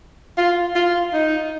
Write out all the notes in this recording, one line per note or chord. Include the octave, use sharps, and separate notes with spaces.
F4
F4
D#4